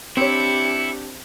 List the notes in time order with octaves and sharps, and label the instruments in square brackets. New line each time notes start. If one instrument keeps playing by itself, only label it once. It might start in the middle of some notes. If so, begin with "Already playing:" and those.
[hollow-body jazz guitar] C4 C#5 [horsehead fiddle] D4 G4 [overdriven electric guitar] E4 [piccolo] C#7